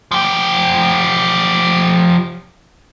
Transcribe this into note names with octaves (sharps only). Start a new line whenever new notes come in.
F3 G4